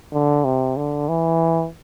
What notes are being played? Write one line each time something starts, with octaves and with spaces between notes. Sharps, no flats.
D3
C3
D3
E3